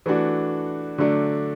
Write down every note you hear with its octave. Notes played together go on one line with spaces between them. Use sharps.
E3 A3 D4 F#4
D3 F#3 A3 D4